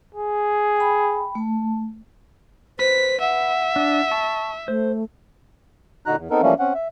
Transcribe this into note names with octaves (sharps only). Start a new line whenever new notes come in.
G#4
G5 B5
A3 A5
B4 C5 B6
E5 F#5
D4
A5 C#6
A3 C5
A#2 D3 D#4 F#4 A#5 F#6
E2
B3 C4 D#4 A4 A#4
E3 F3 G3 A3 A#3 C#4
C4 C#4 F#5
E5